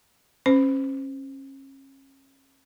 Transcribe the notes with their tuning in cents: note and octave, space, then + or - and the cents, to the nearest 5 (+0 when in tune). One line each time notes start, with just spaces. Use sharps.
C#4 -35 C5 -35